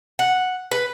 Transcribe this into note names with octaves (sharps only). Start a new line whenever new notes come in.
F#5
B4